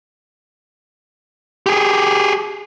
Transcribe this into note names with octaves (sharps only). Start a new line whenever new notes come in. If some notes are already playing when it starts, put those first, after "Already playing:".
G4 G#4